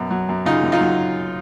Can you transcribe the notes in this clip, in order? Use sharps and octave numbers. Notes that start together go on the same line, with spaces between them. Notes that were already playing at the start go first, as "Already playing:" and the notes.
Already playing: F#2 B2
F#3
F#2
C#3 D#4 F4
F#2
D#4 F4
F#3